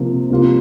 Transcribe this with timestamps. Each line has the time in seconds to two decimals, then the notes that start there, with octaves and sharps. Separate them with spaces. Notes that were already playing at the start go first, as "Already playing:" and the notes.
Already playing: C3 F3 A#3
0.30 C3 G3 A#3 F4